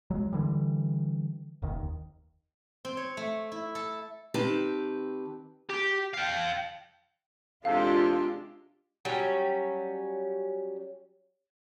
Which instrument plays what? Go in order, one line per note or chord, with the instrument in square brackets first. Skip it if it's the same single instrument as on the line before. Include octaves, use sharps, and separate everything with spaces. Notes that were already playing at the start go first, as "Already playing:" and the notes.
[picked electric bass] D1 F#3 G#3
D3 E3 G3
F1 D#2 D#3
[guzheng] C4
C#5
A3
E4
A4
[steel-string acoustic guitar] D#3 C4 G4 B4 A5
[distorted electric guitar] G4
F5 G5
[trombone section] E2 C3 A4 [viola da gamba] G#3 D4 G4 [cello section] F4 [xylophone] F5
[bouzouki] F#3 G3 C#4